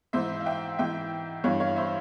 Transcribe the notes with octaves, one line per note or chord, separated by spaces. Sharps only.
G#2 E3 C5 E5
F5
E5 G5
G#2 E3 E5 G5
G2 E3 C#5 F5
C#5 F5
C5 E5